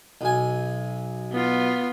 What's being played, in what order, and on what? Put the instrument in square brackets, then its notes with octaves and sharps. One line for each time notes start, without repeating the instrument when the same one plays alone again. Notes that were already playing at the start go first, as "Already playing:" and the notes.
[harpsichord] B1 G#5
[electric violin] B3 F4